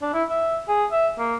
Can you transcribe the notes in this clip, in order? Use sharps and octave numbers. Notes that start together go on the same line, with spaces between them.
D4
E4
E5
G#4
E5
A#3